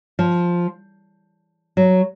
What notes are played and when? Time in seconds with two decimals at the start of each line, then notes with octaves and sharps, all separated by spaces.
0.19 F3
1.77 F#3